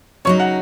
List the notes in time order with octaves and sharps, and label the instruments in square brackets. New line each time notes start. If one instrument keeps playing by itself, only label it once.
[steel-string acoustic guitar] C#3 F#3 D#4 [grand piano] C#5 C#6
[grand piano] F#5